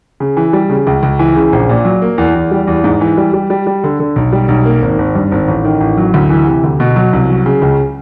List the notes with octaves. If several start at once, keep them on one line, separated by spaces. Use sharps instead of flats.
C#3
E3
G3
C#3
C#2
C#2
E3
C#3
A#1
A#2
F#3
A#3
E2
E2
G3
E2
G#2
E3
G3
G3
G3
G3
D3
D3
B1
G3
B1
A#3
G#1
G#1
G2
G#1
A1
D#3
A1
F#3
D2
E3
C3
D2
B2
F#3
C2
F#3
C#3
C#2